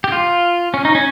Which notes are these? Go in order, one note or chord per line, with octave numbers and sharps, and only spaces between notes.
G4
F4
C#4
D#4
C#4